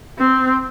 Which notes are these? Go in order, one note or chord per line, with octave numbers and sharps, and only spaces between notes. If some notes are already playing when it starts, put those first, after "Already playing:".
C4